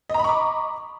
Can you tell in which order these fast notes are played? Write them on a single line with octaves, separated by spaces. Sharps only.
D#5 A#5 B5 C#6 D6